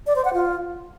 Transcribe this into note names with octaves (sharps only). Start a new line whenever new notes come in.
D5
C5
F#5
F4